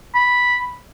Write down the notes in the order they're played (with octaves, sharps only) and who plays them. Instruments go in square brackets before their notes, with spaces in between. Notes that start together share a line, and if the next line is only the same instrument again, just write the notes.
[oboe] B5